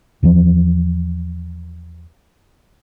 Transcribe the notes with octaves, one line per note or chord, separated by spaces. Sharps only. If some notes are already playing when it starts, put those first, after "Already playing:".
E2 E3 F3